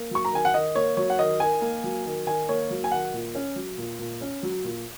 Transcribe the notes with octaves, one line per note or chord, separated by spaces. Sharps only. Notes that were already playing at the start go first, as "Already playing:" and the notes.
Already playing: A#3
F#3 C#6
A#5
D#3 G#5
F#5
D#3 D#5
A#3 C#5
F#3 C#5
F#5
D#3 D#5
D#3 G#5
A#3
F#3
D#3
D#3 G#5
A#3 C#5
F#3
G#5
D#3 F#5
A#2
C#4
F#3
A#2
A#2
C#4
F#3
A#2